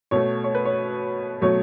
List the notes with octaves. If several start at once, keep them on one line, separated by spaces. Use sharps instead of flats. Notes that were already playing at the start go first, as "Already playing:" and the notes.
B2 A3 C#5
C#5
B4
C#5
B2 F#3 A3 C#5